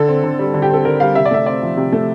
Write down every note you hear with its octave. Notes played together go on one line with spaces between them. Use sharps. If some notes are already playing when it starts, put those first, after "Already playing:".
Already playing: D3 A4
C4
D3
G3
D3
G4
C4 A4
D3 A#4
G3 F5
C3 E5
D5
A3 E5
C4 D5
F3
C3
A3